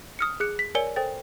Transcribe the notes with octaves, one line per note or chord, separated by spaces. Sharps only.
D#6 F6 C#7
G#4 F#6 C#7
B6
A#4 C#5 D5 G#5 C#7 G7
A4 C5 G5 A6